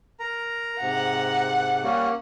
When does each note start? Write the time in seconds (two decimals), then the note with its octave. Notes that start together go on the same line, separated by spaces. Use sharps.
0.20 A#4 A#5
0.81 G#2 C3 F#5
1.83 G3 A#3 C#4